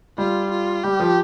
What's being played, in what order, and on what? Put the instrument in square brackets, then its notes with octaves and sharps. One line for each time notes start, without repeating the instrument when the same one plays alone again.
[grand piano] G3 [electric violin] F4
[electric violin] F4
[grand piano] G3 [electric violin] G4
[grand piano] F3